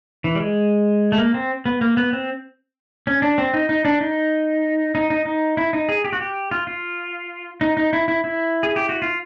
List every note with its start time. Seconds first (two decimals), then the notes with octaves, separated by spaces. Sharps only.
0.24 E3
0.35 G3
0.40 G#3
1.12 A3
1.18 A#3
1.34 C4
1.66 B3
1.81 A#3
1.97 B3
2.13 C4
3.07 C#4
3.22 D4
3.38 C4
3.53 D#4
3.69 D#4
3.85 D4
4.01 D#4
4.95 D#4
5.10 D#4
5.26 D#4
5.57 E4
5.73 D#4
5.89 G#4
6.04 G4
6.13 F#4
6.21 G4
6.51 F4
6.67 F4
7.61 D#4
7.77 D#4
7.93 E4
8.08 E4
8.24 E4
8.63 G#4
8.76 G4
8.89 F#4
9.02 F4